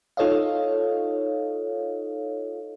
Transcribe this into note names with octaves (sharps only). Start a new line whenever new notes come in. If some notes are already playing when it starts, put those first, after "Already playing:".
D#4 F4 A4 C#5 D#5 F5